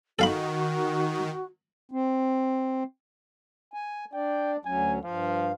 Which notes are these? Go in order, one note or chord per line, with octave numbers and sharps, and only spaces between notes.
D#3 F#4 A4 F5 B5
C4
G#5
D4 D5 G5
D2 F#3 C#4 G#5
G2 F3 F5